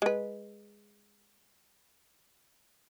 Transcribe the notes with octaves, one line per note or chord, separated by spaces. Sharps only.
G#3 B4